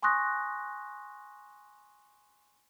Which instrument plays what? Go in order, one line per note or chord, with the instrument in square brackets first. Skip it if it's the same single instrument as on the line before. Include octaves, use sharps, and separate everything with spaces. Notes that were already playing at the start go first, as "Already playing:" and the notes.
[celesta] G#5 C6 C#6 D#6 F#6 A#6